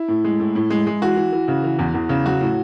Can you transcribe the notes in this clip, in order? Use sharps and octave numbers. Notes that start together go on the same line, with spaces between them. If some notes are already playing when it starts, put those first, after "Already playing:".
Already playing: E4
A2
G#3
A2
A2
G#3
G#3
E3 F#4
E3
E3
C#3
E3
E2
E2
C#3
F#3 F#4
A2